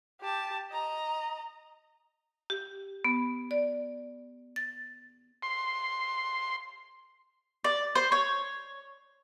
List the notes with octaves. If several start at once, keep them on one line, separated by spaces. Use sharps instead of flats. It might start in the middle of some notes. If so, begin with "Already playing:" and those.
G4 A5
D#5 A#5
G4
B3
D5
A6
C6
D5
C5
C#5